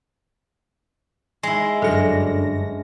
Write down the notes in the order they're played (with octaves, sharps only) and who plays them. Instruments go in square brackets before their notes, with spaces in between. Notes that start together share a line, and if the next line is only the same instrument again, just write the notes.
[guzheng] G#3 E4
[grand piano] G1 F6 C#7 [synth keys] F#2 D4 A#6 [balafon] A4